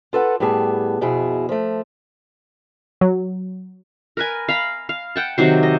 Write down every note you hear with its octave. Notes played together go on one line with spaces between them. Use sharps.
F4 A4 B4 F#5
A2 G3 B3 G4 G#4 A5
F2 B2 E4 G#4
F3 A3
F#3
A#4 B4 G#5
F5 A#5 B5
F5
F#5 G5 A5
C3 D#3 F#3 C5
D#5